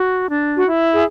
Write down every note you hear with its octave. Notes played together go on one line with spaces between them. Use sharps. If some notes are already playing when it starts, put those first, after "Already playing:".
Already playing: F#4
D4
F#4
E4
G#4